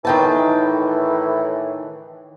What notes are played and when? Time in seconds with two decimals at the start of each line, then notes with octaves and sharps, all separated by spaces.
0.05 A2 D#3 E3 G5 A5